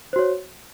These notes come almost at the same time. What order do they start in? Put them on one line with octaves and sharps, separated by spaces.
C5 F#4 C#5